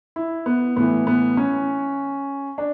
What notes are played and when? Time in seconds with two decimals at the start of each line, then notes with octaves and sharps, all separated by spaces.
0.16 E4
0.46 B3
0.76 A2 E3 B3
1.07 B3
1.37 C#4
2.58 D4